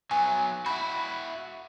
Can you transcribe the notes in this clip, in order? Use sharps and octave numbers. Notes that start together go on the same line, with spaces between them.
F#3 B3 G#5
E4 F#4 B5